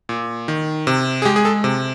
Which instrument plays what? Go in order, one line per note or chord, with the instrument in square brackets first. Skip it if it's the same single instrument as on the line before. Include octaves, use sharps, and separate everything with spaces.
[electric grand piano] A#2
D#3
C3
G#4
G#3 G4
G#4
A4
C3